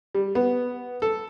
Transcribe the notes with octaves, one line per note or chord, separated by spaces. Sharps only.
G3
B3
A4